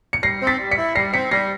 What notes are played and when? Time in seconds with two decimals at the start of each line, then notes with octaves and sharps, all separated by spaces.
0.13 C#7
0.23 G3 A#6 C7
0.42 C4
0.47 A6 B6
0.59 G3
0.71 B6 C#7
0.78 E4
0.95 G3 A#6 C7
1.13 C4 B6 C#7
1.31 G3 A#6 C7